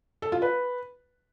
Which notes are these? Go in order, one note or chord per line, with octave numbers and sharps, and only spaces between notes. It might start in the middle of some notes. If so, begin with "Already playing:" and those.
A4
F4
B4